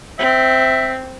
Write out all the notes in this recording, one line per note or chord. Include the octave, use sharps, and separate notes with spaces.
C4 E5